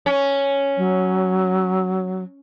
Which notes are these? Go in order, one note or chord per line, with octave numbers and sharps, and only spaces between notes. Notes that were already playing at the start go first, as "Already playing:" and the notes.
C#4
F#3